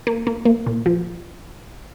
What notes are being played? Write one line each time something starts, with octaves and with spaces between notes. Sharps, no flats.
A#3
A#3
A#3
A#2
F3